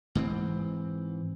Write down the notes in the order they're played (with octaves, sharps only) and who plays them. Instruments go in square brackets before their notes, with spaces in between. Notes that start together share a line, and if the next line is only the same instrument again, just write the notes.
[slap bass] G#2 E3 C4